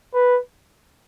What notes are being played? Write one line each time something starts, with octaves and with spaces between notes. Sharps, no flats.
B4